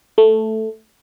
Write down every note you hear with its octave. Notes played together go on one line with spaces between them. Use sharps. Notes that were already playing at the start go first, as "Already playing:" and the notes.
A3